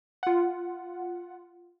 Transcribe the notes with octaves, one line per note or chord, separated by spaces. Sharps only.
F4 F#5